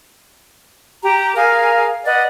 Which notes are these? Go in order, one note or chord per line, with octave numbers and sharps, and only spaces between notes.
G4 A#5
G#4 A#4 F5 G#5
B4 D5 D#5 F#5